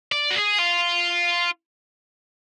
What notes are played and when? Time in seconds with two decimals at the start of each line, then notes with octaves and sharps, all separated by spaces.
0.12 D5
0.31 F#4
0.36 G#4
0.59 F4